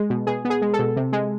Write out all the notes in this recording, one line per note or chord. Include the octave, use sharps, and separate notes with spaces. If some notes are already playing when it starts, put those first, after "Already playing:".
Already playing: G#3
B2
B2 G#4
B3
G#4
G#3
A4
B2
C3
G#3